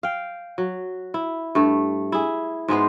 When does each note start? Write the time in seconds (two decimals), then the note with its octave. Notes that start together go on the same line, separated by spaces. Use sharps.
0.03 F5 G5
0.58 F#3
1.14 E4
1.55 G2 A3
2.12 E4 G#4
2.68 G#2 G#3 B3 C5